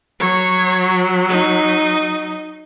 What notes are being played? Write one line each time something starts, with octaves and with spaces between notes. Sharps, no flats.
F#3 C#5
D#4